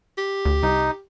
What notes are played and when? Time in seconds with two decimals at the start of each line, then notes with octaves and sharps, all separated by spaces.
0.18 G4
0.45 D2
0.63 C2 D#4